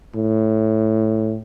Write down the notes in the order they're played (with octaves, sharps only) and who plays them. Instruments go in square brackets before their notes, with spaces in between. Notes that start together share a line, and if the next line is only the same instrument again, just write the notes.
[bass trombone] A2